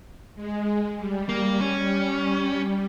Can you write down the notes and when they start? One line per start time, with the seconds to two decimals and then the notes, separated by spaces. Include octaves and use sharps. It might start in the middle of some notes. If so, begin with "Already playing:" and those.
0.35 G#3
0.96 G3
1.29 A#3
1.60 C#4